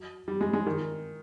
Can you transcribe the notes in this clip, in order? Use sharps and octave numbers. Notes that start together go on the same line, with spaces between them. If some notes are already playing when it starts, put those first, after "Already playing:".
Already playing: F#3
G3
G#3
G#3
D#3